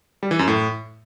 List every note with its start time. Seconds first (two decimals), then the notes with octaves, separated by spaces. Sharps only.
0.23 G3
0.31 E3
0.39 F#2
0.48 A2